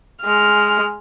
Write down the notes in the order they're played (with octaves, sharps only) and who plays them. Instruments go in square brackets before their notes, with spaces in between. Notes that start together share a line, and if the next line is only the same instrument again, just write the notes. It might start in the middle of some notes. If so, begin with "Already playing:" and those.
[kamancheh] G#3 F6